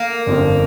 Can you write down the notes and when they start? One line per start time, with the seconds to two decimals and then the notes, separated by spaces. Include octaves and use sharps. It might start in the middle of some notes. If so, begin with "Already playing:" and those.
Already playing: A#3
0.26 G1 F2 F3 C4